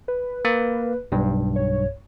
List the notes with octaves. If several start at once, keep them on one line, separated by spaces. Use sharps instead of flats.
B4
A#3
B1 G2
C#5